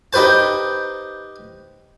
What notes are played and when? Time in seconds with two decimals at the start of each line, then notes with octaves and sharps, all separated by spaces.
0.13 D#4 G4 B4 C5 A5